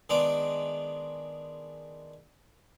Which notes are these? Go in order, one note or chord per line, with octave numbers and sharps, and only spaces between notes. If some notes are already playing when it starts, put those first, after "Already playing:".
D#3 G#3 B3 D4